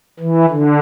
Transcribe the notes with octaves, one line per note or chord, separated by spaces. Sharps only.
E3
D3